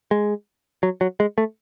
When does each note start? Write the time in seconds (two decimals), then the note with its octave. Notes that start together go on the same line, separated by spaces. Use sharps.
0.11 G#3
0.83 F#3
1.01 F#3
1.20 G#3
1.38 A3